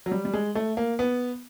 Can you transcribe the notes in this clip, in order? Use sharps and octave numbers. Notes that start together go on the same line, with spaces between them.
F#3
G3
G3
G#3
A3
A#3
B3